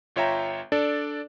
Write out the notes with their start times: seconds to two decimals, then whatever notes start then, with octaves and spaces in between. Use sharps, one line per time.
0.16 G1 F4 C#5 E5 G5 A#5
0.72 D4 A4 D5